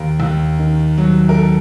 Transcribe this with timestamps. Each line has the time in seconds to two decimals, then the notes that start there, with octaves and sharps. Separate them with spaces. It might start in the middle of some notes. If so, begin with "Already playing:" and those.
Already playing: D#2 A#4
0.20 D#2
0.59 D#3
0.98 F#3
1.29 A#4
1.37 A4